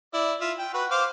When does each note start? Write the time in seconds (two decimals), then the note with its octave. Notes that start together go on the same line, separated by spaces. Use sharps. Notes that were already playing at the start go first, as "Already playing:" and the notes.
0.14 E4 D5
0.41 F4 E5
0.59 G5
0.74 F#4 B4
0.91 C5 F5 D6